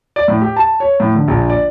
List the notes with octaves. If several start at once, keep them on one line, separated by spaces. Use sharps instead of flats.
D5
A2
G4
A5
C#5
A2
D3
A#1
D5